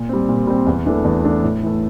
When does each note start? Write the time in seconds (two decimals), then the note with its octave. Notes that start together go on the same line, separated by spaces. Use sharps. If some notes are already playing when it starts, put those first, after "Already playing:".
Already playing: A#2
0.09 G3 C4
0.29 A#2
0.47 G3 C4
0.67 E2
0.86 E3 A3 D4 A4
1.05 E2
1.24 E3 A3 D4 A4
1.43 A2
1.63 E3 A3